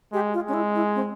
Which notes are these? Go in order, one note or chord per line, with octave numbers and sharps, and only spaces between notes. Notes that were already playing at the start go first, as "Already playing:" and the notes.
G#3 G4
F4
G#3 C#4
E4
E4
C4